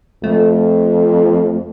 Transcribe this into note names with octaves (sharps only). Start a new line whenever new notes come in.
F2 A3